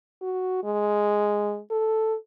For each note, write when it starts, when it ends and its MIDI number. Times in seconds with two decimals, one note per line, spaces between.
0.22 0.61 66
0.64 1.60 56
1.71 2.15 69